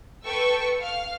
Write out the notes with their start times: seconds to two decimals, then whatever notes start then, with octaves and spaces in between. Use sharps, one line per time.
0.25 A4 B4 G5 A5 C#6 E6
0.81 F5 F6